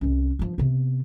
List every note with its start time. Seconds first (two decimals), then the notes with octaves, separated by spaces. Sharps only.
0.01 C2 C#4
0.39 G2 F3
0.58 C3 B3